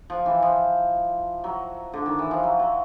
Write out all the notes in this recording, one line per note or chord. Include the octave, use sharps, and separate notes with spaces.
F3
E3
F3
F#3
D3
D#3
E3
F3
F#3
F#3